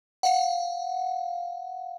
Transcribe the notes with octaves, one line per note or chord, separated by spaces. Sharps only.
F5 F#5